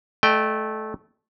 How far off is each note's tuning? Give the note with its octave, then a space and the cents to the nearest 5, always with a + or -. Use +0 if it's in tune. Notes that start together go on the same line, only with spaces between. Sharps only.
A3 -15 D#5 -45 G5 +0